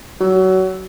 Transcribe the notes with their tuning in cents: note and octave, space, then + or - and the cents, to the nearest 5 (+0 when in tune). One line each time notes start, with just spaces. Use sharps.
F#3 +25